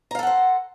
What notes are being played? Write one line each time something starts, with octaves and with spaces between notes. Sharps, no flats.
A4 C5 F5 F#5 A#5